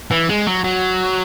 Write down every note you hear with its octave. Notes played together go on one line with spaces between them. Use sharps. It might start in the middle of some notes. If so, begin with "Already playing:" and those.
E3
G#3
F#3
F#3